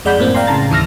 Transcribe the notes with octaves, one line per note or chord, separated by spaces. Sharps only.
F2 G#3 D5 F#5 B5 G6
F#2 A2 A#3 C4
D5 F5 G5 A#5 C6
A2 C#3 A5 A#5 A6
D#2 E3 E4 E6 F6 A#6